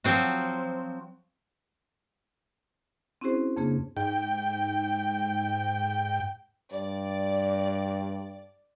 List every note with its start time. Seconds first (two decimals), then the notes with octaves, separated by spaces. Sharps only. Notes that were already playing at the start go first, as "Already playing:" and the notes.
0.04 F3 F#3 C4 F#4
3.21 C4 C#4 E4 F#4 G#4 C5
3.56 F2 C#3 A#3 D4 G#4
3.97 G#2 G5
6.72 G2 D5